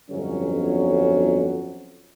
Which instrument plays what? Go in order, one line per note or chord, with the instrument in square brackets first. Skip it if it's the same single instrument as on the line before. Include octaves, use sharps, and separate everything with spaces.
[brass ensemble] G1 F2 F#3 C#4